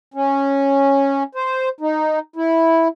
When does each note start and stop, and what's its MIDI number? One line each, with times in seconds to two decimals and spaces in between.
0.14 1.23 61
1.35 1.69 72
1.80 2.19 63
2.36 2.88 64